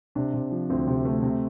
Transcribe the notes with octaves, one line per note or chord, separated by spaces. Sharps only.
C3 D4
C3
F3
D2 C4
C3
A3
C3